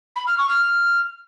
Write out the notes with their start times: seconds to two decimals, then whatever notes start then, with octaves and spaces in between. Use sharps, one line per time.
0.16 B5
0.27 F6
0.38 C#6
0.49 F6